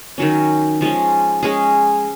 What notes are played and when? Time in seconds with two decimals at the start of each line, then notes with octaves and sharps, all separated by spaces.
0.18 D#3 F#3 C#4
0.81 F3 G#3 C#4
1.43 G#3 C#4 G#4